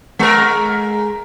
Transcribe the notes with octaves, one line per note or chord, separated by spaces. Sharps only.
G#3 A#4